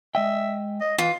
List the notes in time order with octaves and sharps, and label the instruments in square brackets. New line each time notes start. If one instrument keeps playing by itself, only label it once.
[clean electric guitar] G#3 D#5 G5 [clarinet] E5
[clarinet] D#5
[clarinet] E3 [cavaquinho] F4